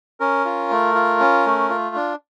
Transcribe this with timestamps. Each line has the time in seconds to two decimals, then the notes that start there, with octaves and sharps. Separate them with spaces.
0.20 C#4 A#4
0.45 F4
0.71 A3
0.95 F4
1.20 C#4
1.46 A3
1.69 F4
1.95 D4